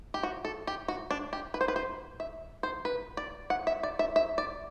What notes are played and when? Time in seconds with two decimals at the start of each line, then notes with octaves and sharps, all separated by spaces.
0.14 G4
0.23 F#4
0.45 A4
0.67 G4
0.88 F#4
1.11 D4
1.33 G4
1.54 B4
1.61 C5
1.68 B4
1.76 C5
2.20 E5
2.63 C5
2.85 B4
3.17 D5
3.50 F#5
3.67 E5
3.83 D5
3.99 E5
4.16 E5
4.38 D5